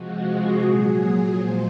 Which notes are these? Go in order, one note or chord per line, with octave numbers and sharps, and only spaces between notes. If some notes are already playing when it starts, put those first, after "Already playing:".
Already playing: C3 F3 G#3 F#4
G#4
A#2 F#3 G#4
A#2 F3 G#3 C5